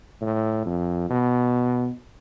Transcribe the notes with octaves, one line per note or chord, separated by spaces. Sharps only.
A2
F2
B2